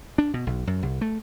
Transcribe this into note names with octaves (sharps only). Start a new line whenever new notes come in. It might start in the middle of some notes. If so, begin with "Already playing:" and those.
D4
B2
B1
F#2
C2
A3